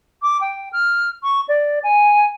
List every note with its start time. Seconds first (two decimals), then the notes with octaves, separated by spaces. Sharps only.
0.22 D6
0.41 G5
0.73 F6
1.23 C#6
1.48 D5
1.83 G#5